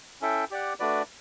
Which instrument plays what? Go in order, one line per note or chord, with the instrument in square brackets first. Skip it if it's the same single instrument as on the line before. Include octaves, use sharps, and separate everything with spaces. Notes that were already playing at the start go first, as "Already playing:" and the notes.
[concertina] C#4 E4 A4 E5 G5
G4 D5 F#5
A3 D4 F#4 B4 D5